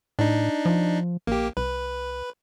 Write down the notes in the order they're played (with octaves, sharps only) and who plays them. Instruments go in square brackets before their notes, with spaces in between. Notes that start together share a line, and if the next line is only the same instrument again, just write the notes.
[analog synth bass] A2 [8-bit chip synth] D4 D#4
[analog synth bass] F3
[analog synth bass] A#1 [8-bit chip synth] A#3 G4
[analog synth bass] C2 [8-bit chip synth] B4